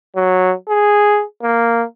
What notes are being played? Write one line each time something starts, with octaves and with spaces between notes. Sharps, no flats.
F#3
G#4
A#3